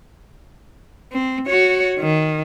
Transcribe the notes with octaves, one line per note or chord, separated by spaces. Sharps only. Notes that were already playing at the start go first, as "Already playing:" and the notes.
C4
F#4 C#5
D#3